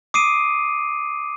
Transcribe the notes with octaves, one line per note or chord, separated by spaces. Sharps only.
D6 D#6 C7 D7 D#7